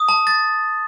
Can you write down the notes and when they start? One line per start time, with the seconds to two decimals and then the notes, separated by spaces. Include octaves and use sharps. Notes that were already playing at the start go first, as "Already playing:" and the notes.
Already playing: D#6
0.09 A5
0.27 A6